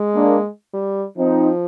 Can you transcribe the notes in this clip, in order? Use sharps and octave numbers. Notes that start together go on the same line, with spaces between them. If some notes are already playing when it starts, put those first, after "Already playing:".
Already playing: G#3
A#3 D4
G3
F3 C4 D#4